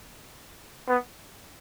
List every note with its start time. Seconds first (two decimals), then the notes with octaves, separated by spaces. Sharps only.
0.88 B3